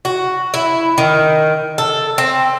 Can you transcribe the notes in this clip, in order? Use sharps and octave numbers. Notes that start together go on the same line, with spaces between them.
F#4
E4
D#3
A4
C4